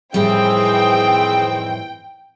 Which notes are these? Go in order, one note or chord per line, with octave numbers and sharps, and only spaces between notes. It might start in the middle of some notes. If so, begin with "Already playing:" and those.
F2 A2 D#3 E3 G3 C4 G#4 G5